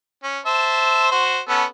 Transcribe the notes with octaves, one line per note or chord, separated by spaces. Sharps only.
C#4
C5 E5 A5
F#4 C5
B3 C#4 A4